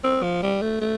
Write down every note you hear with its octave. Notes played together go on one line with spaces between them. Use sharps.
C4
F3
G3
A3
A3